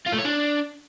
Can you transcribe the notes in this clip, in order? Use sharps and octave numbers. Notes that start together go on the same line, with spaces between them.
F4
A3
C#5
D4